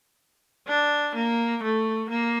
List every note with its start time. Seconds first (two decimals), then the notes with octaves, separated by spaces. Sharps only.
0.67 D4
1.15 A#3
1.63 A3
2.09 A#3